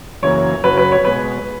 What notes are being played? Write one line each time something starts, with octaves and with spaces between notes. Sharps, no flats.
F#2 C#3 E3 A#3 C#5
F#2 C#3 F#3 B4
B4
C#5
B2 G#3 B4